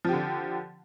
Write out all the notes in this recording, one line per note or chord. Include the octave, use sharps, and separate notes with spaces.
D3 F3 G4